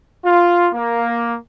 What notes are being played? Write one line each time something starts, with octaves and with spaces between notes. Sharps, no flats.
F4
A#3